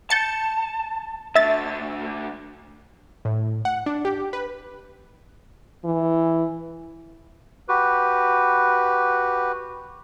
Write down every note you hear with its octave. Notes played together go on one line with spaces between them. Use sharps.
A5 G6 A6 C#7
D3 A3 E5 A6
A2
F#5
D4
G4
B4
E3
F#4 G4 B4